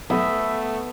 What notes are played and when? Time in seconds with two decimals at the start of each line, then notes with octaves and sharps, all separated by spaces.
0.10 B1 A3 B3 E5